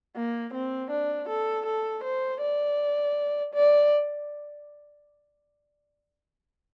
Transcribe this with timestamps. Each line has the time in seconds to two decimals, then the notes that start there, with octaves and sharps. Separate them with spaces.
0.16 A#3
0.54 C4
0.91 D4
1.29 A4
1.66 A4
2.04 C5
2.41 D5
3.54 D5